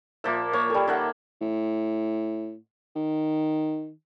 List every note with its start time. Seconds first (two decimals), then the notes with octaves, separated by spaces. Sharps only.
0.24 A#2 F3 A#3 E5
0.53 A#3 C#5
0.70 G3 A4
0.88 D#3 A4 E5 F#5
1.41 A2
2.95 D#3